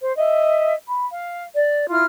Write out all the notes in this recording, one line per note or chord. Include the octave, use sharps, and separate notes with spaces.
C5
D#5 E5
B5
F5
D5
E4 F4 F6